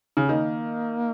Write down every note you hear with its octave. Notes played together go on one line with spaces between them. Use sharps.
C#3
D#3 A#3